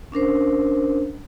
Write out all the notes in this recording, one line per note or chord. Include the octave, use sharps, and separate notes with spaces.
C#4 D4 A#4 C5